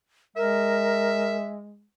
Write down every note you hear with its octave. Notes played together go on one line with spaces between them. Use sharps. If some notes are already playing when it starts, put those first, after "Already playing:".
G#3 A#4 E5